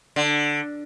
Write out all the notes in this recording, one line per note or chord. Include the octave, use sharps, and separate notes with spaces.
D3